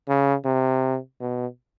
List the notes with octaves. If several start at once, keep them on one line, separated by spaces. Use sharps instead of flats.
C#3
C3
B2